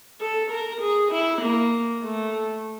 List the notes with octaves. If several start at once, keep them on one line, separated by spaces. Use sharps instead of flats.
A4
A#4
G#4
E4
A#3
A3